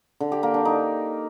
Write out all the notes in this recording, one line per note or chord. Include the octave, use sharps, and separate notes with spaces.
D3
G4
A#3
D4
D#4